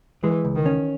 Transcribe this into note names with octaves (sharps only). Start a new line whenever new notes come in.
E3 G#3
C#2
D#3
C#4